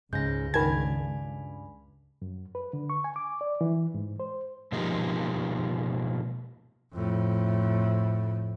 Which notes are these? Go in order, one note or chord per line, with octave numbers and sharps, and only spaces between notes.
C#2 G#2 C#3 G#3 G6 A#6
G2 D#3 G#5 A5 B5 G#6
F#2
B4
D3
C#6
G#5
D6
D5
E3
G#2
C5
B2 F3 G#3 A#3 D#4 G4
F2 A2